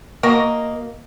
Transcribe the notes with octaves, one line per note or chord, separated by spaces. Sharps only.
A#3 F#4 A#4 D#5